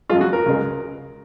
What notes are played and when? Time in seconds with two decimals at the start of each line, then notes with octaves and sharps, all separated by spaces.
0.10 F#2 F3 G#3 F4
0.21 F#4
0.33 A#4
0.46 C#2 C#3 G#3